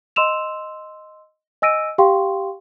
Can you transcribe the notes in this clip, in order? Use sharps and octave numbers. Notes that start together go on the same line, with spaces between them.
D#5 C6 E6 E7 F7
D#5 G#5 E6 A#6 D7 D#7
G4 F5 G5 C6 C#6